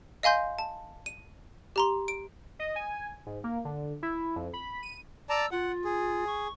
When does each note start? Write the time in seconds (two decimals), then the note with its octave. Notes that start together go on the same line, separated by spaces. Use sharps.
0.23 D#5 F5 G#5 C6 G6
0.59 A5
1.06 D#7
1.76 G4 A#5 C6
2.08 D7
2.59 D#5
2.76 G#5
3.26 G#2
3.44 A#3
3.65 D3
4.03 E4
4.36 F2
4.53 B5
4.83 D#7
5.30 D5 A5 A#5 E6
5.51 F4 F#5
5.85 G#4
6.27 C#6